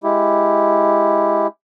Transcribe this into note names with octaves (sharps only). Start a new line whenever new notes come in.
G#3 E4 G4